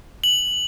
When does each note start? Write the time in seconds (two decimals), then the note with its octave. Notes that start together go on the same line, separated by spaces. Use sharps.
0.24 F#7